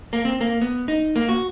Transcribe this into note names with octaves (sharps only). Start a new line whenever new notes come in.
A#3
C4
A#3
B3
D#4
A#3
F#4